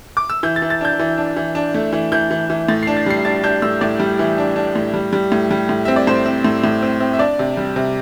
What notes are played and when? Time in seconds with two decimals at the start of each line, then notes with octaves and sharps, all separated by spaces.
0.17 D6
0.30 E6
0.43 E3 G6
0.56 A6
0.62 E3
0.70 A6
0.81 D4 G6
0.99 E3
1.18 D4
1.36 E3
1.55 D4
1.74 A3
1.93 E3
2.12 E3 G6
2.31 E3
2.50 E3
2.69 A2 A6
2.83 D4 C7
2.97 A6
3.06 G3 C7
3.25 D4 A6
3.44 D4 G6
3.62 A2 E6
3.81 A2 D5
4.00 G3
4.19 E3
4.38 D4
4.56 D4
4.76 A2
4.93 G3
5.13 G3
5.32 A2
5.51 G3
5.69 A2
5.85 C4 E5
5.96 D5
6.07 A2 C5
6.26 C4
6.45 A2
6.64 A2
6.82 C4
7.00 C4
7.13 E5
7.19 D4 D5
7.39 C3
7.57 G3
7.76 C3